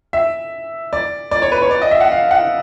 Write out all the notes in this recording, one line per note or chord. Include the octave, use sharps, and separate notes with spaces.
E5
D5
D5
C#5
B4
C#5
D5
D#5
E5
F#5
F5
F#5